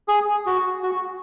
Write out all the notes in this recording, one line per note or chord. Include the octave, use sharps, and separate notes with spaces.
G#4
F#4
F#4